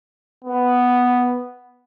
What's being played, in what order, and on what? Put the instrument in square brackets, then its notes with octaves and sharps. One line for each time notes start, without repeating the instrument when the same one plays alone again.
[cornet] B3